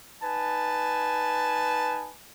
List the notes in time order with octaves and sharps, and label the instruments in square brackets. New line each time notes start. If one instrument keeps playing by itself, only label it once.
[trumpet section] D#4 B4 G#5 A5